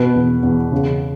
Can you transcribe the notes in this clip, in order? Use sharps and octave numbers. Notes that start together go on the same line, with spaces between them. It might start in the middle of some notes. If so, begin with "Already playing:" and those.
Already playing: B2 B4
E2
E2
C#3